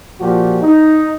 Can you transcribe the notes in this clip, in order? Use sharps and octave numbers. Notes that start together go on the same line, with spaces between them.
A#2 F3 F#4 G4
D#4